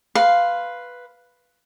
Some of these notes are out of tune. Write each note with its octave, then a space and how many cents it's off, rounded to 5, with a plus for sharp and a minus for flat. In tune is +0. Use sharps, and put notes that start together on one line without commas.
B4 +0 F5 +0 C6 +0